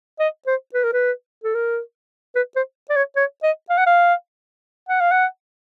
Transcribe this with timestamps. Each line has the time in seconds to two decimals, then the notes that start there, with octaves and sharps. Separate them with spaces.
0.20 D#5
0.47 C5
0.74 B4
0.84 A#4
0.93 B4
1.44 A4
1.55 A#4
2.35 B4
2.56 C5
2.90 D5
2.96 C#5
3.16 C#5
3.43 D#5
3.70 F5
3.77 F#5
3.86 F5
4.89 F#5
5.01 F5
5.11 F#5